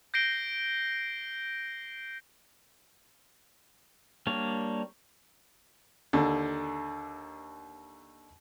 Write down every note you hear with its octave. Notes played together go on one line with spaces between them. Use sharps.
G6 A#6 C7 D7 G7
G3 A#3 D4 C#5
D#2 D3